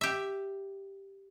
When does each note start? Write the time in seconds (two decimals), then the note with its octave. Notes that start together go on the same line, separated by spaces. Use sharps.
0.01 G4 E5